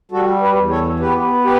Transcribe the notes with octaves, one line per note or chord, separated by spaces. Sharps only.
G3 F#4 A4
G4 B4
E2
A4 C#5
B3 G4 B4
G4 B4